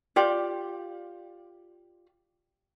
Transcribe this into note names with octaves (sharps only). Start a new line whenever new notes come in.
F4 G4 D5